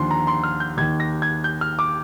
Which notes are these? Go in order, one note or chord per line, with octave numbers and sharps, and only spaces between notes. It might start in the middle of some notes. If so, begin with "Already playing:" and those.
Already playing: D#2 D3 F3 C6
A#5
C6
F6
G6
D#2 D#3 G#6
A#6
G#6
G6
F6
D6